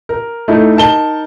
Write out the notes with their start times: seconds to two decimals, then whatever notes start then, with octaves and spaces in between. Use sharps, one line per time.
0.09 A#4
0.48 A3 D#4 E4
0.76 D#4 A#4 A5 G7